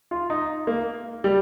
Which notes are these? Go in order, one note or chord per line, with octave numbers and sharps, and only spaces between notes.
F4
D#4
A#3
G3